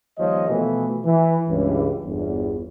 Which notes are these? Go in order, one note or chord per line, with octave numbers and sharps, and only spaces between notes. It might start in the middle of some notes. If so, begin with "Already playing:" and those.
D#2 F3 G3 C#5 D#5
B2 E3 F3 A3
E3
C#2 G2 E3
G1 E2